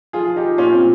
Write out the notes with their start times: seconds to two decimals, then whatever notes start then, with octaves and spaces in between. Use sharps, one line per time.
0.13 F3 F4 G#4
0.28 F3
0.36 D#4 G4
0.44 F3
0.58 A#2 C#4 F4
0.73 A#2 C4